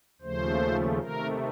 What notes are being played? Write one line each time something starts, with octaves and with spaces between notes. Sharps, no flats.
D#2 C#3 F3 A3 C5
C3 D#3 A3 A#4